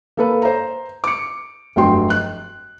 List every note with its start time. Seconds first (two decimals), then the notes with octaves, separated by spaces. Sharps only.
0.17 A#3 A4 B4
0.42 C5 A#5
1.04 D6 C#7
1.76 F1 G2 F#3 F#4 G5 C6
2.10 F#6